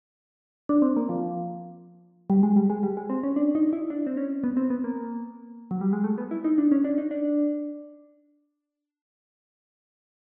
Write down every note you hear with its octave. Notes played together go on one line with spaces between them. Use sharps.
D4
C4
A#3
F3
G3
G#3
G3
G#3
G3
G#3
C4
C#4
D4
D#4
E4
D4
C4
C#4
B3
C4
B3
A#3
F#3
G3
G#3
A3
B3
E4
D#4
D4
C#4
D4
D#4
D4